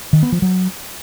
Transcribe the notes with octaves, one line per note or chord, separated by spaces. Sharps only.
D#3
B3
F3
F#3